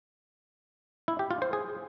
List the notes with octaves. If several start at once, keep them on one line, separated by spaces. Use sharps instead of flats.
E4
G4
F4
C5
G#4